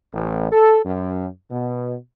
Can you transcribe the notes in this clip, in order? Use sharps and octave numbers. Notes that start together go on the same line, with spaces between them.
A1
A4
F#2
B2